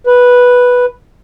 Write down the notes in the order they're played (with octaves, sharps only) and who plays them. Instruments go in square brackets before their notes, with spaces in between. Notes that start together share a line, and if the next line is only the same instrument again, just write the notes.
[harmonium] B4